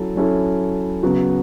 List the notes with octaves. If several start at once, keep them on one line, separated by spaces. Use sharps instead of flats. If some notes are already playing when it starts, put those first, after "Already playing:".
Already playing: F#3 C#4 E4 A4
F#3 C#4 E4 A4
C#3 F#3 B3 F#4